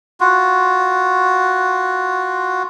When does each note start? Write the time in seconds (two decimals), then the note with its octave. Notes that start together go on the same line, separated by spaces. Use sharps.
0.21 F4 F#4